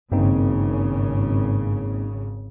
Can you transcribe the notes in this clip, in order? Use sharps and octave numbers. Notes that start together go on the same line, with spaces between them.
G#1 G2 C#3 A#3 C4 D#4